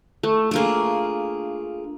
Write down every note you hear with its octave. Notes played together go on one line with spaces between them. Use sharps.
A3
A3 A#3 D4 F4 G#4